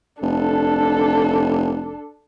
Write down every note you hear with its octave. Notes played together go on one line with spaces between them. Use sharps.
F1 D4 A4